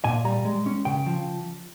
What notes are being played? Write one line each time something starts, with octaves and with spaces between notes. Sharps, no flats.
A#2 G#5
G3 A#5
G#3
C#4
C#3 G5
F3